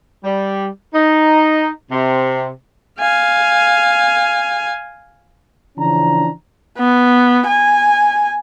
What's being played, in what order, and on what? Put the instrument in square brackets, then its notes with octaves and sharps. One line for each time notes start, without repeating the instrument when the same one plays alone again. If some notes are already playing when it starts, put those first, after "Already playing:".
[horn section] G3
D#4
C3
[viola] F5 G#5
[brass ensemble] C#3 E3 F3 C#4 D4 A#5
[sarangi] B3
G#5